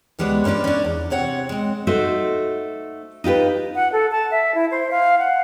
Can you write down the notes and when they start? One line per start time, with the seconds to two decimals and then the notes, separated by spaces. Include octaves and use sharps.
0.19 D2 G3 G#3 B3 B4 C#5
0.44 G2 A#3 C#4 D4 B4
0.64 C#4 D4
0.84 E2
1.10 C3 C4 C#5 F#5
1.49 G#3 C4
1.87 A3 D#4 F#4 C5
3.24 D#4 F4 G4 B4
3.75 F#5
3.93 A4
4.12 A5
4.31 E5
4.55 E4
4.71 C5
4.91 F5
5.19 F#5